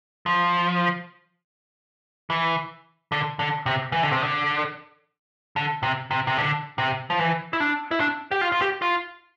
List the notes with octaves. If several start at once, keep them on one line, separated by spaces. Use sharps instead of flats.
F3
E3
D3
D3
C3
E3
D3
C3
D3
D3
C3
C3
C3
D3
C3
F3
E3
E4
D4
E4
D4
G4
F4
F4
G4
F4